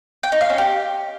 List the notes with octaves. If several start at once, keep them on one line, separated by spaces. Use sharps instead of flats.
G5
D#4
F5
C#4
G4